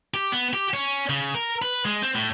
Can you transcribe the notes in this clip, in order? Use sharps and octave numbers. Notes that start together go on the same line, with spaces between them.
G4
B3
G4
C#4
C#3
A#4
B4
G#3
C4
A2